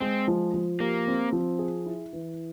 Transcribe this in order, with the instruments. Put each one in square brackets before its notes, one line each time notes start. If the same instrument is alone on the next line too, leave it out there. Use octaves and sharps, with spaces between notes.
[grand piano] G#3 [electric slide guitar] C4
[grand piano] F3
F3
[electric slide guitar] A#3 [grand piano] G4
[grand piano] C4
F3
G#4
E4
E3